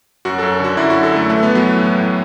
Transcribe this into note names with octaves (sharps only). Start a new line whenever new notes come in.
F#2 F#4
F#2 A4
D3 F#4
F#2 E4
F#4
D3
A4
F#2 A3
E3 A3
E3 B3
F#3
E3 A3
A2
A2